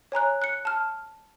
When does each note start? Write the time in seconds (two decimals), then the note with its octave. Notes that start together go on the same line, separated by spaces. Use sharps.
0.12 C#5 G#5 A#5 F#6
0.42 F#6 C#7
0.65 A5 F6